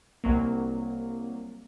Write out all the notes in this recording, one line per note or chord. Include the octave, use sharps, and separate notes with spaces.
C2 F#3 A#3